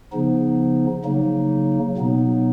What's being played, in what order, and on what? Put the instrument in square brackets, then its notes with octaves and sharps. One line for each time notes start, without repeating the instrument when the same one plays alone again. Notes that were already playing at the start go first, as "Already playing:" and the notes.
[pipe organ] C#3 F3 B3 D#4
C#3 F#3 A#3 D#4
B2 F#3 B3 D#4